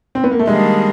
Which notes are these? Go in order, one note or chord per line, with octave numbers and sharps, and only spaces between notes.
C4
B3
A#3
A3
D#3 G3 G#3 A#3 D4